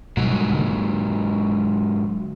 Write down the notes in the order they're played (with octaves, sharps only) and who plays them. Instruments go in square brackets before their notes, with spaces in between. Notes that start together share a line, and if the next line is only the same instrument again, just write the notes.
[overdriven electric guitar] G#2 F#3 [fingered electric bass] B2 G3
[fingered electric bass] D3 G#3 A#3